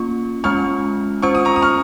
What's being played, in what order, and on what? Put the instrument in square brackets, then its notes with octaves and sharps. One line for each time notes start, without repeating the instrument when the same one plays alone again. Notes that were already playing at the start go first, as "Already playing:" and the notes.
Already playing: [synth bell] A#3 C#4 F4 [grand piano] C#6
[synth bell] G#3 C#4 F4 [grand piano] C#6 F6
[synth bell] C#4 F4 C5 [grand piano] C#6
[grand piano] D#6
A#5 C#6
D#6
C#6 F6